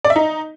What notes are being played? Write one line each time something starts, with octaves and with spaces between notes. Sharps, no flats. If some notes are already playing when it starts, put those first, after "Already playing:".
D5
E5
D#4